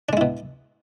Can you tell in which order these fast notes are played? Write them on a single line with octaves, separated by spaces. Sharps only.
D4 G#3 E4 B2